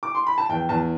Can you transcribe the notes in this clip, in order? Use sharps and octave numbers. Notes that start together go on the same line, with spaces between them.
D6
C6
B5
A5
E2 G5
E2 A5